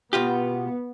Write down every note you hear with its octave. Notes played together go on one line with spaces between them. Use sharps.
B2 B3 F4 G4